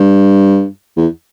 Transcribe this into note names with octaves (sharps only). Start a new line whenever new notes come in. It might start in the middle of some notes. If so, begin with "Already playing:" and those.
Already playing: G2
E2